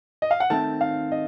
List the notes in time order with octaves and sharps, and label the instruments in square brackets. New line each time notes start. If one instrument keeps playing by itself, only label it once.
[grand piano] D#5
F5
F#5
[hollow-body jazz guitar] D#3 A3 C4 [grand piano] A5
[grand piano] F5
D#5